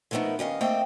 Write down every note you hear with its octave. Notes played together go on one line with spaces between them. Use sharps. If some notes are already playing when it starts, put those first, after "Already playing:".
D3 F3 A3 B3 D#4 A#4
D#2 C#4 D#5 F5
A3 A#3 C4 D#5 G5